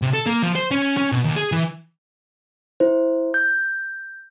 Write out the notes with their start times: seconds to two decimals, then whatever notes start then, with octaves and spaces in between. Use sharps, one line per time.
0.02 C3
0.13 A4
0.26 A#3
0.43 F3
0.55 C5
0.71 C#4
0.97 C#4
1.12 B2
1.24 D#2
1.36 G#4
1.52 E3
2.80 E4 C5
3.34 G6